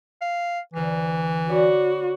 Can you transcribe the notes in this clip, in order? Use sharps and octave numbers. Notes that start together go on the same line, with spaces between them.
F5
D2 E3 F6 C7
F#4 C#5 D5 B5